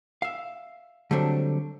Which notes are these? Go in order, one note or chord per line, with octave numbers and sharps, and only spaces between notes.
E5 F5
D3 F#3 G3 A3 C4 D4